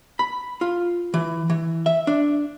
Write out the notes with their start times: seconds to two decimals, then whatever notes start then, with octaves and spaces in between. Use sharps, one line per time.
0.19 B5
0.61 F4
1.14 E3
1.50 E3
1.86 E5
2.07 D4